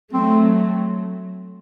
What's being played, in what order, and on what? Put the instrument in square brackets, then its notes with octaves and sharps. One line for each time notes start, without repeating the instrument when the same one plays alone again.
[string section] F#3 A3 [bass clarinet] C4